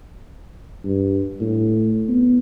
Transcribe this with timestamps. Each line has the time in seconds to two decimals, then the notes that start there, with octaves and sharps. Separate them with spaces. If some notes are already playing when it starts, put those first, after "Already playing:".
0.84 G2
1.41 A2
2.09 B3